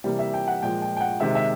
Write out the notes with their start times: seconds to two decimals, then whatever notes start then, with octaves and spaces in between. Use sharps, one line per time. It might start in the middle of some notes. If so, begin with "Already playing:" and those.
0.04 C3 E3 G3 A#3
0.19 E5
0.34 G5
0.48 F#5
0.62 A#2 F3 G#3 G5
0.82 G5
0.97 G5
1.01 F#5
1.20 C3 D#3 G#3 E5
1.35 E5